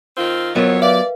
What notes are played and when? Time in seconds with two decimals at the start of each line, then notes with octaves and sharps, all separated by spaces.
0.17 D#3 C4 F4
0.56 F2 F#3 B3 F4 A#4 C#5 D#5
0.82 B4 D5 E5 F5